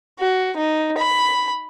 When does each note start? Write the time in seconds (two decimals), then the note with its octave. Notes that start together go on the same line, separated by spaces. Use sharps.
0.20 F#4
0.57 D#4
0.98 B5